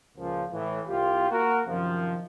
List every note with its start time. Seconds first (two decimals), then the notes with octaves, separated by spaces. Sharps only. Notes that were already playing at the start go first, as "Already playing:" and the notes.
0.16 C#2 A#2 F3
0.51 A2 E3
0.87 C2 F4 G4
1.30 A#3 F#4 A#4
1.66 F#2 C3 D#3 F3